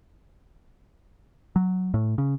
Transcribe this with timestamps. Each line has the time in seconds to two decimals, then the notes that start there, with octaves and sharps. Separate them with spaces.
1.56 F#3
1.94 A2
2.18 C#3